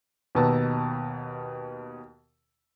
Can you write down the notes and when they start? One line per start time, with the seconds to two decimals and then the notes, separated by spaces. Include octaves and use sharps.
0.35 D#2 B2 B4 A5 A#5 E6